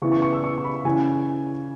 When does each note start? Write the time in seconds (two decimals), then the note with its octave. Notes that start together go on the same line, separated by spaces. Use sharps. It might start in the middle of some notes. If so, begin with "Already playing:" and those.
0.02 C#3 E3 B3 E4 C#6
0.12 C#6
0.22 C#6
0.33 E6
0.44 C#6
0.58 C#6
0.64 B5
0.85 C#3 E3 C#4 G#5